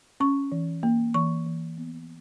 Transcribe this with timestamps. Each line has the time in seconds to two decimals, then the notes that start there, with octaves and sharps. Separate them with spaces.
0.20 C#4 C#6
0.52 E3
0.83 A#3
1.14 E3 C#6
1.46 E3
1.77 B3